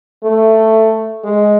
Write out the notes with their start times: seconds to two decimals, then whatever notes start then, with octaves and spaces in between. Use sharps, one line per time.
0.24 A3
1.24 G#3